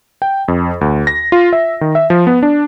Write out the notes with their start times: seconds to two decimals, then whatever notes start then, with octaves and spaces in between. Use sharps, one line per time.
0.22 G5
0.48 F2
0.81 D2
1.07 A#6
1.32 F4
1.53 E5
1.81 D#3
1.95 E5
2.10 F3
2.27 B3
2.43 D4